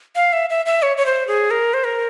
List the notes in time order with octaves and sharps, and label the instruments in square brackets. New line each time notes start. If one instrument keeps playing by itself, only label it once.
[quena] F5
E5
E5
E5
C#5
C#5
C5
G#4
A#4
C5
A#4